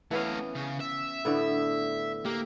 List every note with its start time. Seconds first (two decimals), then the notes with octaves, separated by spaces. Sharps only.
0.11 E3 A3 B3 C#4 F5
0.55 C#3
0.80 E5
1.25 A2 D3 B3
2.25 A#3 G4